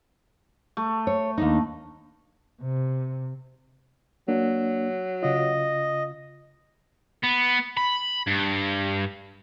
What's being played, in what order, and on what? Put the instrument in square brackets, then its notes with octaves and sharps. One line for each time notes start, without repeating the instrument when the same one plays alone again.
[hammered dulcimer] A3
[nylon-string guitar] C#5
D#2 D4 D#4
[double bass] C3
[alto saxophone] F#3 [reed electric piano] A#3 D4
[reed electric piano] C#3 F4 [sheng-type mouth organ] D#5
[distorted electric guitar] B3
B5
G2